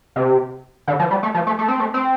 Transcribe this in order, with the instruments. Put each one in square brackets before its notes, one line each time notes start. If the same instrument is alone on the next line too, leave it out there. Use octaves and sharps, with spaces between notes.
[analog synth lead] C3
D3
F3
G3
A3
F3
A3
A3
C4
A3
C4